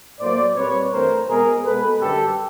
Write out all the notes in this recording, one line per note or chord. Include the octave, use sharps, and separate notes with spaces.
A2 F#3 A#3 C5 D5
A#2 G3 C4 B4 C#5
G2 E3 A3 C4 A#4 C5
B2 G#3 B3 G#4 A#4
B2 G#3 B3 A4 B4
F#2 D3 G3 G4 A4